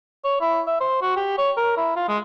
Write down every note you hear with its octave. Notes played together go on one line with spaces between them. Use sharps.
C#5
E4
E5
C5
F#4
G4
C#5
A#4
E4
F4
G#3